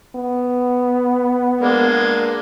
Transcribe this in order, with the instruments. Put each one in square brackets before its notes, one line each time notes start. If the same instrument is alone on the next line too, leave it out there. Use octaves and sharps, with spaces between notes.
[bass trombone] B3
[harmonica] G#3 A#3 D4